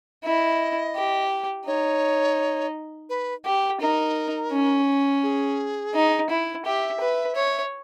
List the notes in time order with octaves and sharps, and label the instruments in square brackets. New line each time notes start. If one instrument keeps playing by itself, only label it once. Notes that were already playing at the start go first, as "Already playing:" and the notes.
[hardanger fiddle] E4 [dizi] E5
[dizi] D#5
[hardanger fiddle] G4
[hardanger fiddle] D#4 [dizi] C#5
[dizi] B4
[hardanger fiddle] G4
[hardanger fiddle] D#4 [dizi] A#4
[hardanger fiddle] C#4
[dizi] G#4
[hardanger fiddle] D#4
E4
[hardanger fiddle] G4 [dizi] E5
[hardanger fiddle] B4
C#5